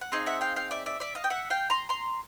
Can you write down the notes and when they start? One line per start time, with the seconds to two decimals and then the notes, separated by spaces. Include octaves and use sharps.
0.01 F#5
0.12 C4 D#4 G#4 D#5 F5
0.26 E5 F#5
0.41 F5 G5
0.56 F5 G5
0.71 D5 E5
0.86 D5 E5
1.00 D5 E5
1.15 D#5 F5
1.24 G5
1.30 E5 F#5
1.50 F5 G5
1.70 A#5 C6
1.89 A#5 C6